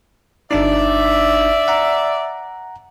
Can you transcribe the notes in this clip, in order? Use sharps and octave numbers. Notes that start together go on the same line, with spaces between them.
G1 D4 D#4 D5 E5
F#5 A#5